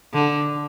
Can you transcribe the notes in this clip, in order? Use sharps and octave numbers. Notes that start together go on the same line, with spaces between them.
D3